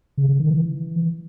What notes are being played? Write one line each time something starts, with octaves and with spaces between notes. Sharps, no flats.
C#3
C#3
D#3
E3